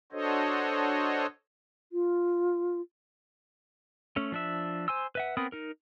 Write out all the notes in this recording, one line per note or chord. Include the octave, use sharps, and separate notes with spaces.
D4 F#4 A4 C5 C#5 D#5
F4
A3 C#4
F3 D4 E5
C5 G#5 C6 E6
B4 E5 F#5
B3 C4 A#4 B5 D#6
D#4 A#4